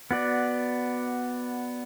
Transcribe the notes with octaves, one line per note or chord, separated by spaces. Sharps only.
B3 F#4 D5